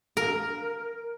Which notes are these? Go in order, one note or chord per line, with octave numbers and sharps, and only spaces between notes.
A#4